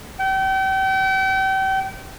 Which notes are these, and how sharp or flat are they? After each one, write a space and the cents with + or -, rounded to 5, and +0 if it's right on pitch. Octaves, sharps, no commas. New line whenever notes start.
G5 -35